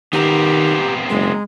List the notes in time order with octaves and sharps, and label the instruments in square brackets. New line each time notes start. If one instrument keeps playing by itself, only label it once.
[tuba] D#3 [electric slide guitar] B3 C4 A#4 [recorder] G4
[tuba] F#1 [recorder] G#3